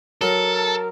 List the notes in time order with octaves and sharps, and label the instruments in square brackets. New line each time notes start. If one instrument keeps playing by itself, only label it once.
[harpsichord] F#3 A5 [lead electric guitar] A4 [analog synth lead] A#4